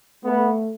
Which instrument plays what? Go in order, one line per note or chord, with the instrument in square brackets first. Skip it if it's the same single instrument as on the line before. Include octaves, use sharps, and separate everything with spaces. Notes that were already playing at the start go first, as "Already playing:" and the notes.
[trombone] A3 [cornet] B3